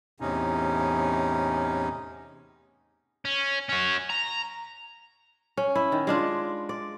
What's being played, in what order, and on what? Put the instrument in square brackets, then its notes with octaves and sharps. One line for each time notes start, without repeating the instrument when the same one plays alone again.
[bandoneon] E2 A2 C3 C#4 D#4
[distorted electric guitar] C#4
C#4 F#4
A#5
[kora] C#4
E4
D#3
G#3 D4 F4
D5